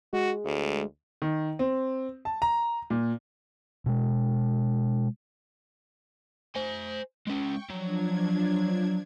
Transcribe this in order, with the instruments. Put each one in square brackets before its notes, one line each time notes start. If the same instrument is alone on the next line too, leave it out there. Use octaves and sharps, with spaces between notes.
[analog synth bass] G#3 [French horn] F#4
[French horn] D2
[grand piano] D#3
C4
A5
A#5
A#2
[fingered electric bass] B2 G#3
[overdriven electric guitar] C5 G#5
[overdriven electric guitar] G#3 C#4 [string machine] G5 C#6
[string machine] F3 D4 G#6 [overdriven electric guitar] F#3